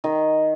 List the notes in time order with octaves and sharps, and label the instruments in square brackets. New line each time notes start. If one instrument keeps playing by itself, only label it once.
[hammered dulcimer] D#3 D#5